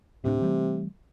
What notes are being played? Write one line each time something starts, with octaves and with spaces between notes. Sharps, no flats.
D1 A2 C3 D4
E3 G3 A3